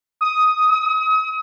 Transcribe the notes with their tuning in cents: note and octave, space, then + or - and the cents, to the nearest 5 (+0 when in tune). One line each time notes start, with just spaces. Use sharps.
D#6 +5
D#6 +35